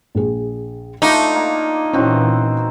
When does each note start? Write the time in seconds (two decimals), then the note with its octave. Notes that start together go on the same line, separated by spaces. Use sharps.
0.15 A#1 G#4
1.02 A3 D4 D#4 F4 D6
1.35 A#3
1.93 A#2 D#3 E3 C4 C#4 E4 F#4